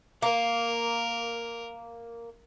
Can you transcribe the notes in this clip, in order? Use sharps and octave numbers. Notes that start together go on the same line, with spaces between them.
A#3 A#4